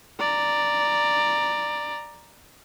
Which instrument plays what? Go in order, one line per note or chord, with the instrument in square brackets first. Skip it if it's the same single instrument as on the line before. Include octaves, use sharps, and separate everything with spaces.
[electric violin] D5 A#5